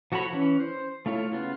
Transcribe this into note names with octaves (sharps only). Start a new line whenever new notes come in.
F3 F#4 A4 C#5 B5
E3 C#4
C5
A3 E4 F4 C#5
C#3 B3 F4